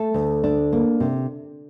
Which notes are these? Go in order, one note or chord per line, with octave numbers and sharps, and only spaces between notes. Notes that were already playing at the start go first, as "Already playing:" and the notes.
Already playing: A3 A4
D2
D4
A#3
C3